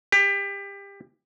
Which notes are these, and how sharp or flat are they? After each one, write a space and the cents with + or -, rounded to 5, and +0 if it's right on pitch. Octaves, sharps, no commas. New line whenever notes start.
G4 +25